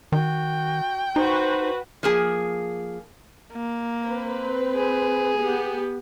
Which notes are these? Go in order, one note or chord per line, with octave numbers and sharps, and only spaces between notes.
D#3 F#4 G5
D#4 F#4 B4 C5
F3 A#3 G#4
A#3
C4 B4
G#4
B3 G4